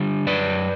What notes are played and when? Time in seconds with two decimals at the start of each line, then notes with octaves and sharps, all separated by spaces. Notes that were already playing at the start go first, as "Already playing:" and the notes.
Already playing: D3 G3
0.26 F#2 B4 D5